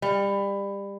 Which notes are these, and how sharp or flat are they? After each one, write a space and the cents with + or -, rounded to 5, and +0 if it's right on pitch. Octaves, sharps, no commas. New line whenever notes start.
G3 +25